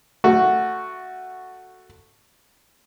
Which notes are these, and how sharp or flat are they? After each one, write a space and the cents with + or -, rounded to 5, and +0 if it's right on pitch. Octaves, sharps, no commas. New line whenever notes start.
A3 +10 F#4 +0